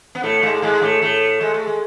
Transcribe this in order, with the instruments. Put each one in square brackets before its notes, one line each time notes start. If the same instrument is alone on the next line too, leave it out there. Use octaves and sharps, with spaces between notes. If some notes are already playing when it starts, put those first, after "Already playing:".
[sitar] B3
A2 A3
G#2 G#3
G#2 G#3
A2 A3
A2 A3
G#3
A3
G#3